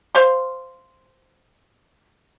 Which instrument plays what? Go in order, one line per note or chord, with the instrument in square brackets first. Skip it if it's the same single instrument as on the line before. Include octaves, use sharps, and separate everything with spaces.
[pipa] C5 F5 C6